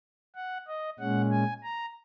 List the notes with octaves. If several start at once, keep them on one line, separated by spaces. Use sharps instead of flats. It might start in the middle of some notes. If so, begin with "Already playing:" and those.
F#5
D#5
A#2 G#3 C#4 F#5
G#5
A#5